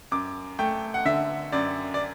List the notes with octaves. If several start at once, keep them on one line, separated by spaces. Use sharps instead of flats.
F#2 D6
A3 G5
F#5
D3 E5
F#2 D5
D5